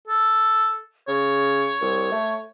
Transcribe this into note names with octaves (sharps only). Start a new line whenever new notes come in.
A4
C#3 C#5
C2
A3